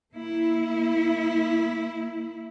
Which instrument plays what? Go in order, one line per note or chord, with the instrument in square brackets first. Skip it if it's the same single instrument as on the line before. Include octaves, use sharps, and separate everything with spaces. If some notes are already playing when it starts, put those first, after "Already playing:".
[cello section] A#3 E4